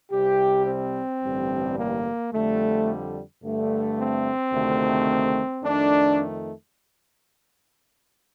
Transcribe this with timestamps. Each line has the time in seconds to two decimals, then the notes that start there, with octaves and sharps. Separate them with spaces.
0.12 C2 C3 G3 G4
0.67 C4
1.23 A1 G2 D3 G3
1.78 A#3
2.33 F2 D3 G3 A3
3.43 G2 D3 A3
3.98 C4
4.53 D2 C3 D#3 A3
5.64 F2 D#3 A3 D4